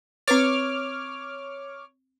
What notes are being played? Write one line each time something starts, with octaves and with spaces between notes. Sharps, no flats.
C4 B4 C#5 D6 F6 A6